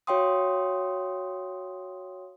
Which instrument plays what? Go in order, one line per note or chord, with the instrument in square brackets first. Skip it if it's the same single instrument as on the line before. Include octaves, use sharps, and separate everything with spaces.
[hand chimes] F#4 C#5 F5 G5 C6 D#6